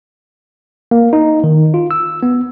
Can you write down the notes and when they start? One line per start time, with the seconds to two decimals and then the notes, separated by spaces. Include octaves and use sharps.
0.91 A#3
1.13 D#4
1.44 D#3
1.74 F4
1.91 E6
2.23 B3